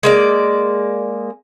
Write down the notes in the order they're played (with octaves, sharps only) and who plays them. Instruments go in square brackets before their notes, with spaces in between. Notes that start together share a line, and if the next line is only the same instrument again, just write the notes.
[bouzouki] G#3 A#3 D5